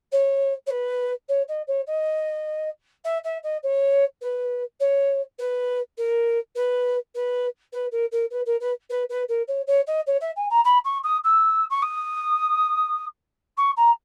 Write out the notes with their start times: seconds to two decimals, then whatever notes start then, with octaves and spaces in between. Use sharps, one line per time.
0.12 C#5
0.66 C#5
0.70 B4
1.28 C#5
1.48 D#5
1.67 C#5
1.87 D#5
3.04 E5
3.24 E5
3.43 D#5
3.63 C#5
4.21 B4
4.80 C#5
5.38 B4
5.97 A#4
6.55 B4
7.14 B4
7.72 B4
7.91 A#4
8.11 A#4
8.30 B4
8.46 A#4
8.60 B4
8.89 B4
9.09 B4
9.28 A#4
9.48 C#5
9.67 C#5
9.87 D#5
10.06 C#5
10.20 E5
10.36 G#5
10.50 A#5
10.64 B5
10.84 C#6
11.03 D#6
11.24 E6
11.70 C#6
11.82 D#6
13.57 C#6
13.76 A#5